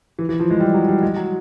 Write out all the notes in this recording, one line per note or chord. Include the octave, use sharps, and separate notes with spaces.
E3
E3
F3
G#3
G3
F#3
G3
G#3
F#3